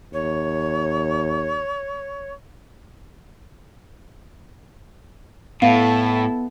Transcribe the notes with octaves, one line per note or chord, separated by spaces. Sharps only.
D#2 C#5
A2 B3 E4 A4 F5